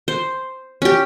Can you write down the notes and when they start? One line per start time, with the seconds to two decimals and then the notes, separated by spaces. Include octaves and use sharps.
0.08 C5
0.82 C#4 G4